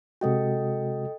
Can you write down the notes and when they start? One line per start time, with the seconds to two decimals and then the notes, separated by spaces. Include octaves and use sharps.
0.21 C3 G#3 F#4 A4 D#5 G5